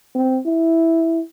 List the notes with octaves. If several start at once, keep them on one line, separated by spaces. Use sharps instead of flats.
C4
E4